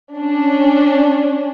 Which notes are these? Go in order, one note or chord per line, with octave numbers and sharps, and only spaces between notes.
C#4 D4